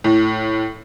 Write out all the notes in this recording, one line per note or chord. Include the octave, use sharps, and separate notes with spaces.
A2